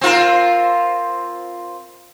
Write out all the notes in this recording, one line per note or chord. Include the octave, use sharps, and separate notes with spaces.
C4 F4 A#4